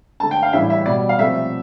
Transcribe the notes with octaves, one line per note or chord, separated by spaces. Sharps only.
D3 A3 A5
G5
F5
A2 E3 G3 E5
E5
B2 G3 D5
F5
C3 F3 A3 E5